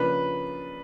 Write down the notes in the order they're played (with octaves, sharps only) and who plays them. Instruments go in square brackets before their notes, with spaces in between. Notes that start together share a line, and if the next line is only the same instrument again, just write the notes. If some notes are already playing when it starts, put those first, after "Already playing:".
Already playing: [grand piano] C#3 F3 A#3 D4 F4 [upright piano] B4